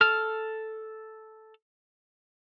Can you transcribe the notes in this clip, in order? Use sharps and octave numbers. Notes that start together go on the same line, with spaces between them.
A4 F6